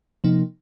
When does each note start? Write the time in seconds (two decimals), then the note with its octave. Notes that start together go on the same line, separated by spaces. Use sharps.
0.24 C3 F3 A#3 D#4